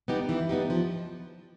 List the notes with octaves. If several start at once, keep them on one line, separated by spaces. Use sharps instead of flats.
G3 B3 D#4 G4
E3
G3 B3 D#4 G4
F3